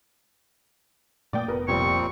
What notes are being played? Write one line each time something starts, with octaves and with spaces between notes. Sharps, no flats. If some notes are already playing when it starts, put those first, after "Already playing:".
A#2 A3 A#3 D5 G5 D#6
F1 B3 A#4 B4
C2 F2 A#2 G3 C4 C#6